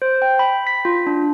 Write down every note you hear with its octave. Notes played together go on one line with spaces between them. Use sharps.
C5
G5
B5
B6
F4
D4